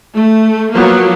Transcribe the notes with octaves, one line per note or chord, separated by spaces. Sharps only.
A3
F3 F#3 A#3 B3